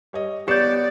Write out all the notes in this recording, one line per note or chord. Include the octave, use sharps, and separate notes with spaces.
G3 C#5 D#5
B3 G4 C#5 D5 C#7 E7